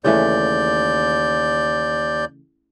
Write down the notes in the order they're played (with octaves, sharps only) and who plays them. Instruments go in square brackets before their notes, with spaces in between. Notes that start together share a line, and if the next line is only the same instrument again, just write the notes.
[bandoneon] D#2 D5 G6 [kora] C#3 E3 A3